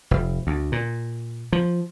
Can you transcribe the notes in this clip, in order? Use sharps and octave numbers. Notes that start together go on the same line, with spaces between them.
F1
D2
A#2
F3